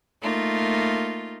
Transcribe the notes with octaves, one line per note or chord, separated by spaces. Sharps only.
A3 A#3 D#4 F4